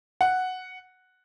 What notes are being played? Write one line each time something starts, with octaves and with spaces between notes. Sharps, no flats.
F#5